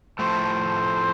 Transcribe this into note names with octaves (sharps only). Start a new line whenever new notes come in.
A2 F3 A3 C5